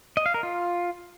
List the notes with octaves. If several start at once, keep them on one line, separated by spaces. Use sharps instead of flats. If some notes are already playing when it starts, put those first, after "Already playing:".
D#5
F5
A#4
F4